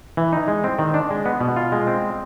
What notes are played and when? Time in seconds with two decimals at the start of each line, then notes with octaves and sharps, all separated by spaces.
0.17 E3
0.33 D#4
0.48 G#3
0.64 C4
0.79 D#3
0.94 D4
1.11 G#3
1.26 B3
1.40 B2
1.56 F4
1.72 G#3
1.87 C4